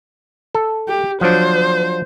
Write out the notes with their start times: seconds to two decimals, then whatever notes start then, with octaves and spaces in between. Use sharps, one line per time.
0.55 A4
0.88 G4
1.21 F3 F#3 D4 C5